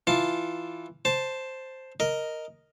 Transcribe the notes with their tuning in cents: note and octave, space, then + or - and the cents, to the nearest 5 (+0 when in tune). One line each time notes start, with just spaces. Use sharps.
E3 +0 F4 +0 A5 +0
C5 +0 A5 +0
A#4 +0 D#5 +0